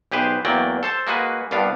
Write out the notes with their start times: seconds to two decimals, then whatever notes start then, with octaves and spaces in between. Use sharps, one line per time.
0.12 B1 G4 G#4 B4 C5
0.45 E2 F#3 A#3 D5 G5
0.83 A4 C5 A5
1.07 G#3 A#3 F#4 G#4 B4
1.51 C2 G2 B3 D4 F5